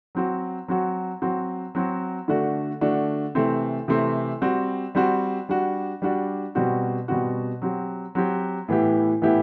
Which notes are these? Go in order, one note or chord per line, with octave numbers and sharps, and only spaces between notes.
F#3 C4 F#4
F#3 C4 F#4
F#3 C4 F#4
F#3 C4 F#4
D3 A3 D4 F#4
D3 A3 D4 F#4
C3 E3 A3 C4
C3 E3 A3 C4
G3 C4 F#4
G3 C4 F#4
G3 D4 F#4
G3 D4 F#4
B2 G3 C4 F#4
B2 G3 C4 F#4
F#3 C4 G4
F#3 C4 G4
A2 E3 B3 E4 G4
A2 E3 B3 E4 G4